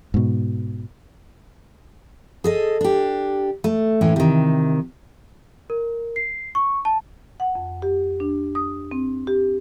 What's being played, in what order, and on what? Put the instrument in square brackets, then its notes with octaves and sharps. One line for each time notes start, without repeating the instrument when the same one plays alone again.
[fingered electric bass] G#2 B2
[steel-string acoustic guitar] G#4 A4 D#5
D4 G4
A3
A2 E3 C#4
C3 D#3
[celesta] A#4
C7
C#6
A5
[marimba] F#5
F2
G4
D4
D#6
C4
G4